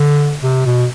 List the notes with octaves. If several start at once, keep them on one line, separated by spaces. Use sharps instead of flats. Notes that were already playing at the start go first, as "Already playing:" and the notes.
Already playing: D3
C3
B2